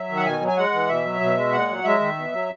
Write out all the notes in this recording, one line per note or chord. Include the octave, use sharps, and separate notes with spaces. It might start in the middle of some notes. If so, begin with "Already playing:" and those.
Already playing: F#3 E5
D#3
F#5
B2 G#5
F#3
G#5
G#3 F#5
E3
B2 E5
F#3
B2
G#3
A#2 F#5
F#3
G#3 E5
D#3
B2
F#3